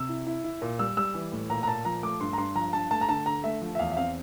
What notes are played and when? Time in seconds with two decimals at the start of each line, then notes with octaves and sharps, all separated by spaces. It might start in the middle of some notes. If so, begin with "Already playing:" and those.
Already playing: C3 E6
0.09 E4
0.27 E4
0.44 E4
0.62 A#2
0.79 G3 E6
0.97 G3 E6
1.14 E3
1.32 A2
1.50 A#2 A#5
1.63 A#5
1.67 A#2 A5
1.85 F3 A#5
2.03 A3 D6
2.21 G2 C6
2.33 A#5
2.38 G2 C6
2.55 F3 A#5
2.73 G2 A5
2.91 A3 A5
3.01 A#5
3.09 D3 A5
3.26 D3 A#5
3.44 A3 E5
3.61 F3
3.75 E5
3.79 E2 F5
3.92 E5
3.97 C4 F5